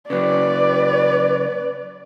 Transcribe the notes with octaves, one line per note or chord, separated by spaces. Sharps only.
C#3 F#3 B4 D5